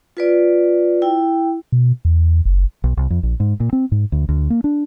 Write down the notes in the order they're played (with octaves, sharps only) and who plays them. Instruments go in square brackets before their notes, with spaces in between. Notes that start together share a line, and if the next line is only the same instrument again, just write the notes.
[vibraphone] F4 B4 D5
E4 G5
[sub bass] B2
E2
F#1
[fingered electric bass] B1
C2
F2
A#1
G#2
A#2
C4
G#2
D2
D2
A#3
D4